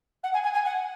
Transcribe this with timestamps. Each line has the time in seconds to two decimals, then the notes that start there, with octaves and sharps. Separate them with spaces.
0.23 F#5
0.33 G#5
0.43 G#5
0.54 G#5
0.65 F#5